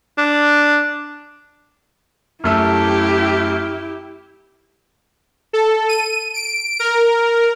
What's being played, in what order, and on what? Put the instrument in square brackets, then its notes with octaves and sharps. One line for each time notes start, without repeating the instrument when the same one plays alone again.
[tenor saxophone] D4
[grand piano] F#2 A3 E6 [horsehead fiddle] E4 G4
[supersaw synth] A4
D#7
D7
A#4